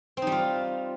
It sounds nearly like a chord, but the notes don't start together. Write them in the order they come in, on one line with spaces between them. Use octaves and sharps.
C4 D#4 G3 F4